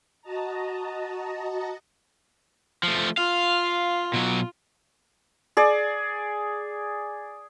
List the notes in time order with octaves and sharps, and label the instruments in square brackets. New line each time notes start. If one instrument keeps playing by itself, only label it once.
[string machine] F#4 D#5 A5 A#5
[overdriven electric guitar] F3 A3
[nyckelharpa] F4 [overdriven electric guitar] F5
[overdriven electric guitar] B2 F#3
[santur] G#4 D5